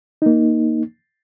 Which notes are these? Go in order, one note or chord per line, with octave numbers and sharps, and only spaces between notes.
A#3 D#4